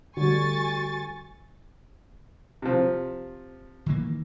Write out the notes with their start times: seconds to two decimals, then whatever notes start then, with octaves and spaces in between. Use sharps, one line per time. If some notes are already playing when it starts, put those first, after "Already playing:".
0.17 D3 G3 F#4 G#5 C#6 A6
2.62 C3 F3
3.86 D#3 E3 A#3